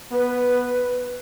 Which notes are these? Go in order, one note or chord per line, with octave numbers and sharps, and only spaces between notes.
B3 B4